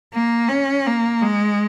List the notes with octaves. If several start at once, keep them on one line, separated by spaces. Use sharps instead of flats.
A#3
C#4
A#3
G#3